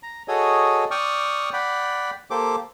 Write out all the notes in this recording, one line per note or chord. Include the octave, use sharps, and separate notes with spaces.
A#5
F#4 G#4 A4 C#5 D#5
D5 G5 C#6 D#6 F6
D5 F#5 G5 B5
A#3 G4 A4 C5 D6